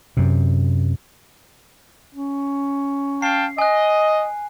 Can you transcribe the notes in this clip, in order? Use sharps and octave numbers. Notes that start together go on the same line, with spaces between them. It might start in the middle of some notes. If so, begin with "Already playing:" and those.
F#2 C3
C#4
F5 G5 A5 C7
D#5 G#5 F#6